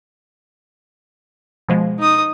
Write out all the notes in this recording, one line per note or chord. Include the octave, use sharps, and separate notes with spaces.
B2 F3 G#3
D#4 D#6